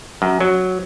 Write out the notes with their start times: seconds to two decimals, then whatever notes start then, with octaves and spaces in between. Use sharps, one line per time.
0.22 F#2
0.40 F#3